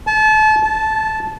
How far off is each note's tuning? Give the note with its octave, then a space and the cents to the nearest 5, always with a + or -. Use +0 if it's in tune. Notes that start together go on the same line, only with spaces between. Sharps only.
A5 -30
A5 -10